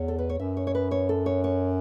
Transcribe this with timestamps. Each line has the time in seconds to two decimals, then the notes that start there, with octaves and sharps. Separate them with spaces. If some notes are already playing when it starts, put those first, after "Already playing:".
Already playing: E2 C#5
0.08 A4
0.19 B4
0.29 C#5
0.39 F#2 E5
0.57 C#5
0.67 C#5
0.75 B4
0.91 C#5
1.09 A4
1.26 C#5
1.44 C#5